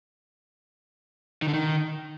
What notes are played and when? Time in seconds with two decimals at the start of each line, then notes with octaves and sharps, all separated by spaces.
1.42 D#3
1.48 D3
1.54 D#3